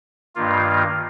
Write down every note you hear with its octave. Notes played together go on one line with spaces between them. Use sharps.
G2 D#3 A#3 F4